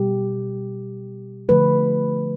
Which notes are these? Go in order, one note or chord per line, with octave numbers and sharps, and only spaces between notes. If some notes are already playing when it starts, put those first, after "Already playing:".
Already playing: B2 G3 G4
D3 F3 A3 B4